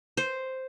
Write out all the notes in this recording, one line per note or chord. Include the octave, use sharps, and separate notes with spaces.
C5